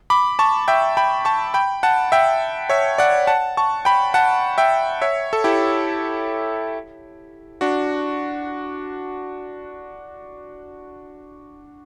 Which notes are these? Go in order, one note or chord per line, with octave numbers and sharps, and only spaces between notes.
B5 D6
A5 C#6
E5 G5
G5 B5
A5 C#6
G5 B5
F#5 A5
E5 G5
C#5 E5
D5 F#5
F#5 A5
A5 C#6
G5 B5
F#5 A5
E5 G5
C#5 E5
A4
E4 G4
D4 F#4